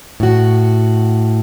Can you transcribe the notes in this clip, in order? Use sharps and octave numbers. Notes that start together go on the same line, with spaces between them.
A2 F#4